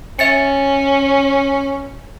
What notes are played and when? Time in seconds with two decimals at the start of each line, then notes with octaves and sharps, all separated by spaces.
0.19 C#4 E5 A6 C#7